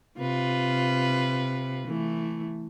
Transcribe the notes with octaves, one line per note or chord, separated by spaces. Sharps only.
C3 F4 B4
E3 A3